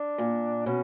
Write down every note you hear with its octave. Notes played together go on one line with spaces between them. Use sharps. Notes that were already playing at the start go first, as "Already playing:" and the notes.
Already playing: D4
A#2
B2 C#4